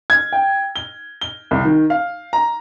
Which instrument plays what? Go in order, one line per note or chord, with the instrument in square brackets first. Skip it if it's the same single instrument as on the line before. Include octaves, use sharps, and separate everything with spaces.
[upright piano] G#6
G5
G7
G7
C2
D#3
F5
A#5